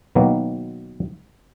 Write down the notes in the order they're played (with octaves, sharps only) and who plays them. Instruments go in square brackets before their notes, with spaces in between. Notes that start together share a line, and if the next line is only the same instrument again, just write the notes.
[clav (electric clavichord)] B2 D#3 F#3 A#3 B3